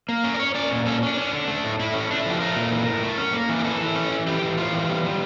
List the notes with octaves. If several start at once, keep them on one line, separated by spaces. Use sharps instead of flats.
A#3
C#4 A#4
D5
C#4 C#5
C#4 D5
A#2
C#4 A4
C#4 D4
C#4
D3
A3
A2
A2 E4
A3 C#4
A3 D4
E4
F3 G4
A3 A#4
A#2
E3
A2
A3
C#4
A#3
E3
G4
E3 A4
E3
C#4
E3
E3 G4
E3
A2 F4
E3
G3
G3